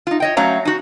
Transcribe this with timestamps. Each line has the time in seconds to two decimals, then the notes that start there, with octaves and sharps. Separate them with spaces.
0.07 D#4 F4
0.20 C#5 D#5 G5
0.37 F#3 A3 C#4 F5 A#5
0.65 D#4 F#4